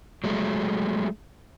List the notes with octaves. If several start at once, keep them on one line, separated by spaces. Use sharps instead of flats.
F#3 G#3 A3